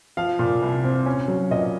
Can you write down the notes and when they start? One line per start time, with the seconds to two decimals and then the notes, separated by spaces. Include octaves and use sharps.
0.17 F3 F5
0.39 A#2
0.62 C2
0.84 C4
1.06 C#4
1.28 F#3
1.51 A#2 D#5